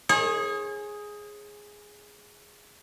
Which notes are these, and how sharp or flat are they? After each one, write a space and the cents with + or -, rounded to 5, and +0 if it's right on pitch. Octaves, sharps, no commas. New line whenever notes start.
G#4 +0 C#5 -40